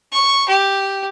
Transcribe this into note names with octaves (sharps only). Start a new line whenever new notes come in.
C#6
G4